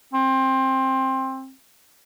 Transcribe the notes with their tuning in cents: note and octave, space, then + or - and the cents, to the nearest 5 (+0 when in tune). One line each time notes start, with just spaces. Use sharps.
C4 +20